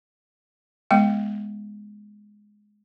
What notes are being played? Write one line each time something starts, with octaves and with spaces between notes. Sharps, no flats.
G#3 B3 G5